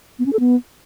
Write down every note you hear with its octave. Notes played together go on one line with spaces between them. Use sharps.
B3
C#4
A4
B3